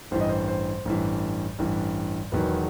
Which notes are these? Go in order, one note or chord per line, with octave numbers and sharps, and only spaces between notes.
A1 G2 E3 C5
D#5
C5
C5
A1 G2 E3
A1 G2 E3
E1 E2 D#3 F#3 B4